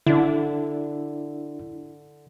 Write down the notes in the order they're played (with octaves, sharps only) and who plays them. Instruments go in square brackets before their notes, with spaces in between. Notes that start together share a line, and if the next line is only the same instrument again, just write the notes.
[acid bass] D3 [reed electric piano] D4 E4